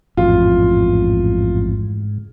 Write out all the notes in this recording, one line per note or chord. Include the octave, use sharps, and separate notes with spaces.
A1 F2 G#2 F4